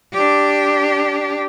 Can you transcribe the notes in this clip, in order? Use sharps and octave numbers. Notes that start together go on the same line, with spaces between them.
D4 G4